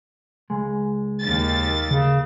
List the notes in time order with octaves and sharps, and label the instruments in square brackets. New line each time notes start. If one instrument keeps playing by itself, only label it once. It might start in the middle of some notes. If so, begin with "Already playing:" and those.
[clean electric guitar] C#2 G#3
[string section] D#2 A6
[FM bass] C#3